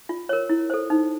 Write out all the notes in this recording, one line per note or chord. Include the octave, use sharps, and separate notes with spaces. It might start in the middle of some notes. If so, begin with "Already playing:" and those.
F4
A#4 C#5
E4
A4 C5
D#4